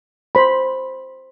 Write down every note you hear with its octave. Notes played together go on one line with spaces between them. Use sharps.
C5 B5